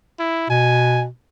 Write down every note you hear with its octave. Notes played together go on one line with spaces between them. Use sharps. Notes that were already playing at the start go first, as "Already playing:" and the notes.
E4
B2 G#5